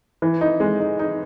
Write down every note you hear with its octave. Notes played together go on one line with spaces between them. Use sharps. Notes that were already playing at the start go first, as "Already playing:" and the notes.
E3
D#4
G#3
D#4
D#4